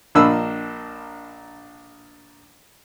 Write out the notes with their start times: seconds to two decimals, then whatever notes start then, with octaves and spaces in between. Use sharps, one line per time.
0.15 A#1 A#3 D4 D#5 B5 E6